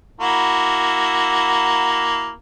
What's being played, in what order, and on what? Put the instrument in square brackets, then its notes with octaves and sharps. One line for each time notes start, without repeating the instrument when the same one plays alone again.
[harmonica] A#3 E4 F#4